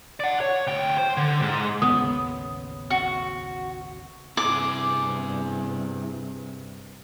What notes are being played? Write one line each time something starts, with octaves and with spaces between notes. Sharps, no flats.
D5 F#5
C#5
D2 G5
C5
D3
G#2
A1 D#2 C#3 B3 D#6
F#4
G2 C3 E4 G#4 D6